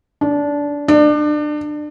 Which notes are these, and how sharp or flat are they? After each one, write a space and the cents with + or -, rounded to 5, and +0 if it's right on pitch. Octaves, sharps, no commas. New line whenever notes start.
D4 -20
D4 +30